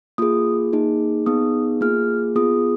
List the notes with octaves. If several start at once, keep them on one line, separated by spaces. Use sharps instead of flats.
A#3 F4 G#4 D#6
A#3 D#4 G#4
B3 D#4 G#4 D#6
A#3 F4 G#4 F6
B3 F4 G#4 D#6